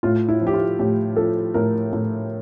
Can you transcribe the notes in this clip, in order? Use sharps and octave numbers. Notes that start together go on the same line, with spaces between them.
A2 F4
E4
F3
G4
F4
A2 G4
F3 A4
A2 A#4
A2